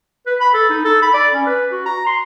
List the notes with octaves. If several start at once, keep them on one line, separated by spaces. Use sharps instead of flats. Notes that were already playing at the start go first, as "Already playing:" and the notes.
B4
B5
A4
D#4
A4
B5
D5
C#4
B4
F#4
A#5
C6